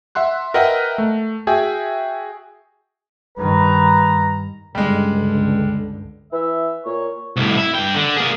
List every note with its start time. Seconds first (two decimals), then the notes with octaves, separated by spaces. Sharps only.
0.15 E5 F#5 C6 F#6
0.54 A#4 B4 D#5 E5 F#5 G5
0.98 A3
1.47 F#4 G#4 E5 G5 G#5
3.38 G2 D#3 B4 A#5
4.75 C#2 G2 D3 G3 G#3
6.33 E3 E5
6.85 A#2 C#5
7.37 C2 A2
7.57 E4
7.75 G2 G5
7.95 D3
8.17 A#3 G#4